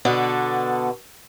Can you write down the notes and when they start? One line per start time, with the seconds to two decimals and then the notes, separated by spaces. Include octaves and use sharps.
0.05 B2 D3 B3 D4 A4